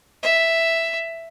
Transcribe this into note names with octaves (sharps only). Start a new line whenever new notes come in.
E5